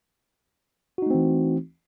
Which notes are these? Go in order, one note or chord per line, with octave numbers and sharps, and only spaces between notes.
E3 A3 C4 D#4 F#4